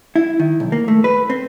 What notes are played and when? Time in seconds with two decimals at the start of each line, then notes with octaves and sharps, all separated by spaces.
0.16 E4
0.40 D#3
0.60 B1
0.72 A#3
0.88 A3
1.04 B4
1.30 C4